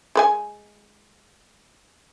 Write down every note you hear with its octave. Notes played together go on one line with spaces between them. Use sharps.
G#3 B4 G#5